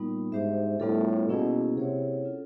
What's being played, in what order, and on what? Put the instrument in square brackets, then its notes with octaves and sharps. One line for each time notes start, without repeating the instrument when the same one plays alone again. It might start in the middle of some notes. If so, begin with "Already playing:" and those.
Already playing: [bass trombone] A#2 [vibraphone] G3 B3 D#4
[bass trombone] G#2 [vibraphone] D4 G4 C5 E5
[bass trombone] A2 [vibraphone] G3 B3 D4 F4 A4
[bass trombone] B2 [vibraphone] A#3 C#4 E4 G#4
[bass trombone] C3 [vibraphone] E4 G#4 C#5 F#5
[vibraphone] C#4 F4 A4